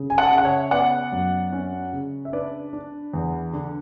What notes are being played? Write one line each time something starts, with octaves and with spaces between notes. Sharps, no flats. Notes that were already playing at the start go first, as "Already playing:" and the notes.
Already playing: C#3
G#5
F#5 A5
C#3
F#5
C#5 E5
B3 D5 F#5
F#2
C#4
C#3
E5
D4 B4 D5
D4
E2
D3